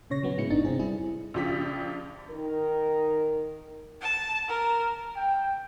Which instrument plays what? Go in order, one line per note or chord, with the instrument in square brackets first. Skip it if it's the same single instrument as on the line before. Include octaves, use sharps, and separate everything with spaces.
[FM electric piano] A#2 C#3 C#5 A#6
F#3 B3 C#4
A2 G#3 E4 C#7
G1 D4 D#4 A6
C3 C4 G#4
G3 E4 G#4
[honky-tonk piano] A#1 C#3 F3 G4 B6
[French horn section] D#3 A#4
[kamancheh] A5
A#4
[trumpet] G5